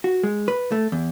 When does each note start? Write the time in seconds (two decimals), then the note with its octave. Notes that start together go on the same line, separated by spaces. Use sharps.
0.04 F#4
0.23 G#3
0.48 B4
0.72 A3
0.92 E2